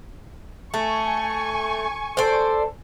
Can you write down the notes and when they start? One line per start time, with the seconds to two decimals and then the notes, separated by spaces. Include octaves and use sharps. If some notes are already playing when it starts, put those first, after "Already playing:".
0.74 A3 G#5 C#6
2.17 A4 C5 D5